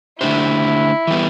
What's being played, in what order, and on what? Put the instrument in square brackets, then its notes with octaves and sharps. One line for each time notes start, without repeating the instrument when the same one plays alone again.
[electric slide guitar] D3 A3 D4 G4 C5 [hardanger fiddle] E4
[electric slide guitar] E3 G3 B3